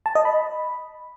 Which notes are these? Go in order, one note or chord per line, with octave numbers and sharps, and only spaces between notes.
A5
D#5
B5